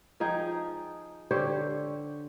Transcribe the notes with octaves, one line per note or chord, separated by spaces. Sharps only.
F3 D#4 G#4 G5
D3 G4 C5 C#5